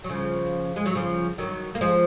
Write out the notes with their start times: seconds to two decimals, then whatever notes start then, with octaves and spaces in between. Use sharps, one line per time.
0.04 F#3
0.09 C#3 F3
0.76 G#3
0.86 F#3
0.95 C#3 F3
1.38 D#3 F#3
1.75 A#3
1.81 F3 G#3